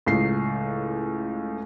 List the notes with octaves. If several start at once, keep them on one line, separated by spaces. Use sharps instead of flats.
C#2 A2 C7